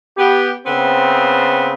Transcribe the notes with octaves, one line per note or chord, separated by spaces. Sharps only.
B3 G4
C#3 B3 C4